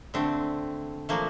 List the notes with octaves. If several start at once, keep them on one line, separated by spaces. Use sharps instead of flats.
D3 A3 C4
A#2 F3 A3 A#3